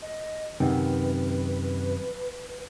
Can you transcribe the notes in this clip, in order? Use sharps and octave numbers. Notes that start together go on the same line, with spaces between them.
D#5
F#2 C3 D#3 B4